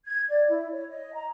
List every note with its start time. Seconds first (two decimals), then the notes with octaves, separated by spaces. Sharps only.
0.06 G#6
0.29 D5
0.49 E4
0.73 C#5
0.89 D#5
1.14 A#5